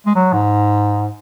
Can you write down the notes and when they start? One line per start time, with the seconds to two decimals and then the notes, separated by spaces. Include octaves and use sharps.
0.06 G#3
0.15 F#3
0.33 G#2